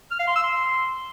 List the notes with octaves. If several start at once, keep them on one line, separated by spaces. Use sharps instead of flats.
F6
F5
C6
E6
C6